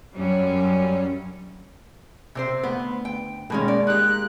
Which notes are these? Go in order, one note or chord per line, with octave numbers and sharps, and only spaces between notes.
F#2 F#3 G3 C#4
C3 C4 C5
D2 B3
G5
B2 D#3 G#3 A#3 C#4
D5
D#4 G4 F#6